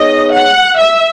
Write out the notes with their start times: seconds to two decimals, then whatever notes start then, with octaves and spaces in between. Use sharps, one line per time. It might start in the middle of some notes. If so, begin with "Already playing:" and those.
Already playing: B3 D#4 G#4 C#5 D#5
0.33 F#5
0.79 E5